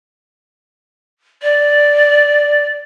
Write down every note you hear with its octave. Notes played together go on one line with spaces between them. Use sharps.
D5